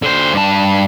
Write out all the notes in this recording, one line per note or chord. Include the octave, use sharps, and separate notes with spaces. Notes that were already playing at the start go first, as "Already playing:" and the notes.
D3 C5
G2 A5